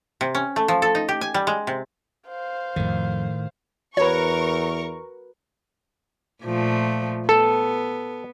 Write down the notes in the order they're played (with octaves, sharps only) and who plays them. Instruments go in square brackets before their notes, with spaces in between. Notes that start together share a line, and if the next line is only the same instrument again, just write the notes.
[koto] C3
C#4
A3
F3
A4
D#4
G4
G#5
G3
G#3
C3
[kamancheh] C5 F5
[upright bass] F2 F3 [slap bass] A2 D#3
[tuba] E2 [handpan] F#4 B4 [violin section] A#4 C#6 [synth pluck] C#5
[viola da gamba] A#2 F3 A3
[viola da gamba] B3 [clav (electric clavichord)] A4